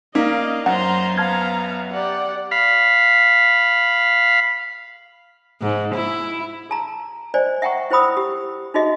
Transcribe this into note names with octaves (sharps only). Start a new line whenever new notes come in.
A#3 C#4 D#4 D5 D#5 F5 B6
F#2 C5 F#5 A#5 C6
B3 F5 A5 A#5 F6 G#6
G4 D5 F#5
F5 B5
G#2
E4
G#4 A5 A#5
C5 D5 D#5 G#5
E5 F#5 G5 A#5 C#6
E4 C5 G5 B5 D#6 E6
G4
D#4 F4 F#4 G#4 D#5 E5